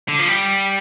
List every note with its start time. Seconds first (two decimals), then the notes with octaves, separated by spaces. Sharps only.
0.09 D3
0.19 F3
0.28 G3